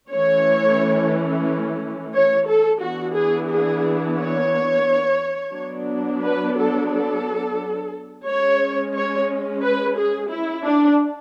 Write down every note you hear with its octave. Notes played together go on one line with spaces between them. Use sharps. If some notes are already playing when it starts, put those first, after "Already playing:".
E3 A3 C#4 C#5
C#5
A4
E3 B3 D4 F#4
G#4
G#4
C#5
F#3 B3 D4
B4
A4
A4
G#3 C#4 C#5
C#5
B4
G#4
E4
D4